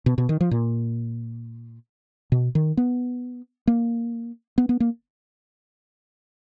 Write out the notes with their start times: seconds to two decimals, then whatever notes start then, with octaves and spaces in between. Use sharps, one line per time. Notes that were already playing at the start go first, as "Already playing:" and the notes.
0.06 B2
0.18 B2
0.29 D#3
0.41 F3
0.51 A#2
2.32 B2
2.55 D#3
2.77 B3
3.67 A#3
4.58 B3
4.69 B3
4.80 A#3